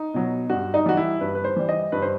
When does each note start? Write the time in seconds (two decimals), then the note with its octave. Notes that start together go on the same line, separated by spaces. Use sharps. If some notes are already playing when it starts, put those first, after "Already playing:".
Already playing: D#4
0.14 B2 F#3
0.50 G2 F#4
0.74 D#4
0.86 E3 G3 F#4
0.97 E4
1.21 G2 B4
1.35 B4
1.44 C5
1.56 E3 G3
1.69 D#5
1.92 G2 B4
2.02 C5